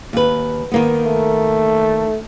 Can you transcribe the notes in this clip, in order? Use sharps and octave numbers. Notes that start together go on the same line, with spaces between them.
D#2 B4
D#3 A#3 B3
A3